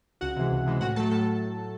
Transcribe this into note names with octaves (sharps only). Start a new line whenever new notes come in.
C#2 F#4 F#5
C3 E3 G#3
C#2
C3 E3 G#3
A2 F#4 F#5
F#3 A3 A4 A5
A2 A4 A5